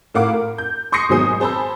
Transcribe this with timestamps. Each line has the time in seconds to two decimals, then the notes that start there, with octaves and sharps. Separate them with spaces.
0.14 A2 A#4 F5 F#5 D6
0.33 A#4
0.58 G6
0.92 C6 C#6 D#6 A#6 C7 C#7
1.09 G#1 B2 F#3 G#4 C5 D#6
1.40 G#4 C5 A5 B5 E6